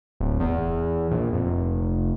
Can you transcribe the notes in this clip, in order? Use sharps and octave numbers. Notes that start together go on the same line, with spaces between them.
D1
E2
A#1
F1